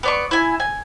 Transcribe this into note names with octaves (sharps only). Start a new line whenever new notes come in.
B3 D5 C#6
E4 G#5
G#5